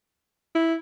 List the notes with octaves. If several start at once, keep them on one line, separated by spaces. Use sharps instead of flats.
E4